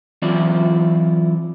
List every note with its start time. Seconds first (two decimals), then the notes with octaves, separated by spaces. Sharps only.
0.22 E3 F#3 C4 E4 F4 D5